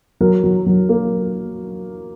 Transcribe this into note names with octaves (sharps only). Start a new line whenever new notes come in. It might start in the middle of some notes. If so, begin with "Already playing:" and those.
F#3 A#4
F#3
F#3
A#3